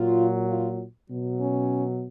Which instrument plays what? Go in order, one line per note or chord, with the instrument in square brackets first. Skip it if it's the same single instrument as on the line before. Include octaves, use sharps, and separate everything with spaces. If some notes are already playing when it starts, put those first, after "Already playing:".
Already playing: [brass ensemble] A#2 F#3 F4
F4
B2 F#3
C#4